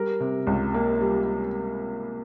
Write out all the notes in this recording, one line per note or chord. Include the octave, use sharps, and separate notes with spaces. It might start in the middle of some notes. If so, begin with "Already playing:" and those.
Already playing: G3 A#4
C3
C#2
A#3
G3